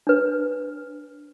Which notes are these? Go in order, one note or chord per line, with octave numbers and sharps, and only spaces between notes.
D4 B4